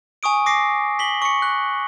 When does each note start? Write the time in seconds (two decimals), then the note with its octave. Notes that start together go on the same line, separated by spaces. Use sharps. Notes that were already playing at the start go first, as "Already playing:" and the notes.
0.23 G#5 C#6 D#6 D7
0.46 D6 A#6 C7
0.99 B6 F#7 G7
1.22 C#6 C#7
1.42 F#6